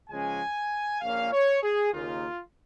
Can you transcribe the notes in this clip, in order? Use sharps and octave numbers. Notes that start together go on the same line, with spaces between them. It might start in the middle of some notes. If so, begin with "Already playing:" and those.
C#2 C#3 F3 G#3 C#4 G#5
A#1 A#2 A#3 C#4 F5
C#5
G#4
D#2 C#3 A#3 D#4 F4